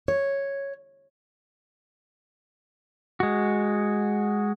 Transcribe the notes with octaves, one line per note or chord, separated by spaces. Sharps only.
C#5
G#3 F#4